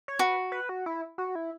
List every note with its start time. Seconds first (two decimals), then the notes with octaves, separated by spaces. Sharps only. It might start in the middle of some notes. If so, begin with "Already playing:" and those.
0.08 C#5
0.19 F#4 B4
0.52 B4
0.69 F#4
0.86 E4
1.18 F#4
1.35 E4